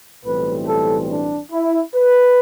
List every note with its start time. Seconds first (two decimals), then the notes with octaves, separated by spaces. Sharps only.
0.24 B1 A2 E3 G3 C4 B4
0.67 A4
1.09 D4
1.51 E4
1.94 B4